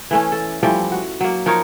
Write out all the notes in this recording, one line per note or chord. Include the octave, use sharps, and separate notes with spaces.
E3 A3 C#4
A4
E3 F3 G3 A3
F#4
F#3 A#3
F3 D#4 A#4 C#5